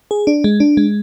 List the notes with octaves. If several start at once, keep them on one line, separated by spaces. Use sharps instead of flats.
G#4
D4
G#3
D4
G#3